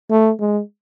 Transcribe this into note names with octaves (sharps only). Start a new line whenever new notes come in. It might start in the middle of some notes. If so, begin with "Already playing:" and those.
A3
G#3